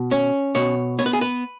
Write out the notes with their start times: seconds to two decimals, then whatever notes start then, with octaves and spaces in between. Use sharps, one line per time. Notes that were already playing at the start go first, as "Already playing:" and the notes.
Already playing: B2
0.11 C#4 C#5
0.55 B2 C#5
0.99 B3 C#5
1.06 B4
1.13 G#4
1.21 B4